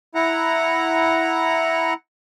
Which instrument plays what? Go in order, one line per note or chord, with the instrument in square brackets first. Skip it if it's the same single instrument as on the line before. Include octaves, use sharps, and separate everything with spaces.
[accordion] E4 F#5 A#5